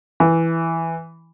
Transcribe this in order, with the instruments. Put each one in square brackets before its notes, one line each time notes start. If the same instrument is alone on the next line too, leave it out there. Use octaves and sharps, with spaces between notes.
[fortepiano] E3